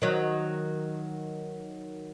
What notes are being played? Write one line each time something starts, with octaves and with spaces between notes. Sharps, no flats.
D#3 F#3